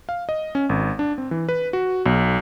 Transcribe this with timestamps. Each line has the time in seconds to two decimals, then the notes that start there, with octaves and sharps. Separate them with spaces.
0.09 F5
0.29 D#5
0.55 C#4
0.69 G#1
0.99 D4
1.18 C4
1.31 E3
1.49 B4
1.73 F#4
2.06 B1